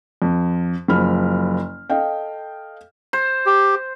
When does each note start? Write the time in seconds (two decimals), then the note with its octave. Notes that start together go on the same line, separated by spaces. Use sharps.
0.22 F2
0.88 F#1 F3 B5 F6
1.90 A4 D#5 F5 G5
3.13 C5
3.46 G4